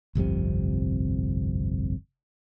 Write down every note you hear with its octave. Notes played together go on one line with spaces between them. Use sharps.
G1 C2 F2 C3